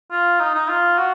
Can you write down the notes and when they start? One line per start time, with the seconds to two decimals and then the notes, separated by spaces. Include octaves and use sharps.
0.11 F4
0.40 D#4
0.55 D#4
0.69 F4
0.98 F#4